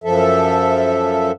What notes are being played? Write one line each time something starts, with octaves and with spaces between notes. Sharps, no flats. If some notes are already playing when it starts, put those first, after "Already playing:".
F#2 F3 A4 E5